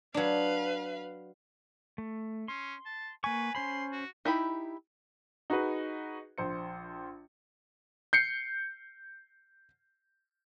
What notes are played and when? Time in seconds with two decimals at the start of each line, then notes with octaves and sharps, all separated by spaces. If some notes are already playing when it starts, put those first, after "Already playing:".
0.14 F#3 D4 B4 F5
1.98 A3
2.48 C#4 C6
2.86 A5
3.24 A#3 B4 G#5 C#6
3.55 C#4 C5 B5 C6
3.92 F#4
4.25 D#4 E4 G4 B5
5.50 D#4 F#4 G#4 B4
6.38 A#1 C5 C#7
8.13 G6 C7 C#7